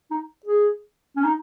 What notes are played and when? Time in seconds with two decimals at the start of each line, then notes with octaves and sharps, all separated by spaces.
0.11 D#4
0.46 G#4
1.17 C#4
1.24 D#4